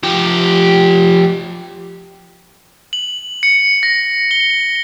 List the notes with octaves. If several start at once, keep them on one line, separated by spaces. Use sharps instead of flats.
F3 G4
F#7
C#7
A#6
G7